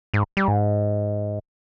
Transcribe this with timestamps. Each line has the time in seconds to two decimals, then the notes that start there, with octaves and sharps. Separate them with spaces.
0.14 G#2
0.37 G3
0.48 G#2